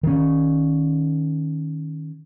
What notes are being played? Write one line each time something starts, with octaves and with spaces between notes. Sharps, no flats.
D#3 C#4